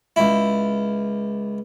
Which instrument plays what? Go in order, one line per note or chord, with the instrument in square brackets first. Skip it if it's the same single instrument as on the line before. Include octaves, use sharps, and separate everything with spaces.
[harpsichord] C#2 E4